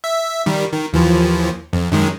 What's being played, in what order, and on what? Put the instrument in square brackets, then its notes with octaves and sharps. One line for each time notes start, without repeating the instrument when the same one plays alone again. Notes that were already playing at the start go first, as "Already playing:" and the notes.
[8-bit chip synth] E5
D#3 G3
D#3
D#2 E3 F3
F2
F#2 D#3 G#3